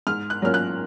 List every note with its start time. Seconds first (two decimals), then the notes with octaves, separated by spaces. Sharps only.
0.07 G#2 F6
0.30 F#6
0.42 F#3 A#3 C#4 F4 F6
0.54 F#6